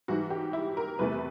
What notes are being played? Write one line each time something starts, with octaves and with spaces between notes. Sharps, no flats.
G#2 E3 G3 F#4
G4
E4
A#4
E2 C3 E3 A3 B4